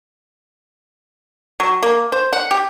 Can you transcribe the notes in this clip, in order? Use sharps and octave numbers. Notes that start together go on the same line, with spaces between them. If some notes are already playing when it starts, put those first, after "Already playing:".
F#3
A#3
C5
F#5
G4